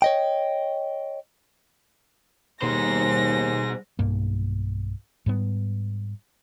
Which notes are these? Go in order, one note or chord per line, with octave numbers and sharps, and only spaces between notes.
C#5 D#5 G5
D#2 B2 G3 G#4 C5 A#6
B1 G2 A#3
G#2 G3 B3